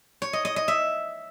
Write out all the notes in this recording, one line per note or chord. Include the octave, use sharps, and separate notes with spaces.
C#5
D#5
D#5
D#5
E5